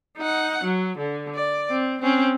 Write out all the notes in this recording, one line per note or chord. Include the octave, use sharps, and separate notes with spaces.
D#4 F#5
F#3
D3
D5
C4
C4 C#4